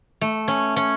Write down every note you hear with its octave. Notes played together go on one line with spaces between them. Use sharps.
A3
C#4
C#4